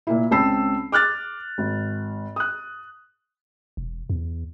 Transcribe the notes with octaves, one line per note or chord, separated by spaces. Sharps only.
A#2 A#3 E4
C#2 C4 A5 B5 E6 C7
D6 F6 F#6 A6
G#1
D#6 F#6
E1
E2